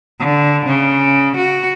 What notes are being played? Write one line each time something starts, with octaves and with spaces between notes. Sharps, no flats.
D3
C#3
F#4